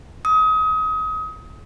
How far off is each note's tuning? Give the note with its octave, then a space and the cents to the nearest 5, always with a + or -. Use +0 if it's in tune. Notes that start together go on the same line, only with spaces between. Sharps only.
D#6 +30